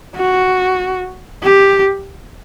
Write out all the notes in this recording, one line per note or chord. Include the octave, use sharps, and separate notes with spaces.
F#4
G4